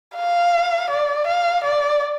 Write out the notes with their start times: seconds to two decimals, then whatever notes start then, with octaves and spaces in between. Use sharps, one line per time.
0.16 F5
0.90 D5
1.27 F5
1.64 D5